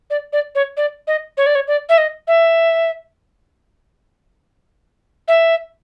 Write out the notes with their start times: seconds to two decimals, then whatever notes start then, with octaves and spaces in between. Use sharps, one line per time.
0.10 D5
0.33 D5
0.55 C#5
0.77 D5
1.07 D#5
1.37 C#5
1.46 D5
1.55 C#5
1.67 D5
1.89 E5
1.98 D#5
2.27 E5
5.28 E5